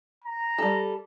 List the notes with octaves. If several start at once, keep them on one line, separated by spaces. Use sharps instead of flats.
A#5
G3 A4